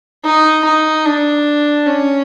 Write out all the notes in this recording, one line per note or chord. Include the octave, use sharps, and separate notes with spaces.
D#4
D#4
D4
C#4